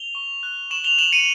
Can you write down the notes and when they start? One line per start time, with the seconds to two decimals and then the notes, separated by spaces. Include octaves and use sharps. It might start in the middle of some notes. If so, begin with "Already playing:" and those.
Already playing: F7 G7
0.15 C#6
0.43 F#6
0.71 C#6 E7 F#7
0.84 F7 G7
0.98 F#6 E7 F#7
1.13 C#7 D#7